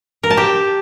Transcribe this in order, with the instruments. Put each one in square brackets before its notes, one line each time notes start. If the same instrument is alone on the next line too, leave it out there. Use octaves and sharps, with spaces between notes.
[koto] A#4
A5
G4